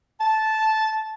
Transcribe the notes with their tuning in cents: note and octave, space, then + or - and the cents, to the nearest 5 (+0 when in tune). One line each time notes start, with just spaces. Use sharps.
A5 -10